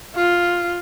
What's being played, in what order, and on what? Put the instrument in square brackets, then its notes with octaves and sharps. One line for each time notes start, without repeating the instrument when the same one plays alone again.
[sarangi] F4